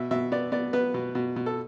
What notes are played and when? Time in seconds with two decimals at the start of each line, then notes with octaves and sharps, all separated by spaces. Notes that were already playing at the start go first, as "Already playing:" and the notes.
Already playing: B2 E5
0.11 B2 E5
0.32 B3 D5
0.52 B3 D5
0.73 B3 B4
0.94 B2
1.15 B2
1.36 B2
1.46 A4